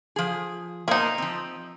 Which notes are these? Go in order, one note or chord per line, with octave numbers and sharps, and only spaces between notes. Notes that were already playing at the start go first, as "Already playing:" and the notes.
F3 G#4
B2 A#3 D#4 G#4 C5
F3 C4